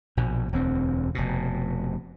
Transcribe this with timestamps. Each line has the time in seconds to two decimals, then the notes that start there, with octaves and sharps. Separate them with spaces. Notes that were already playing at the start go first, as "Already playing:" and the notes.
0.17 A#1 B2
0.52 E1 D2 C4
1.15 F1 B2